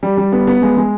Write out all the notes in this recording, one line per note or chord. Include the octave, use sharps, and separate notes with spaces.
G3
G3
B3
B3
G#3
G#3